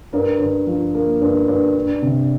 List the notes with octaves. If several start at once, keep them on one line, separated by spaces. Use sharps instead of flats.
G2 A#4
G2
F3
A#3
G2
G2
D4
C3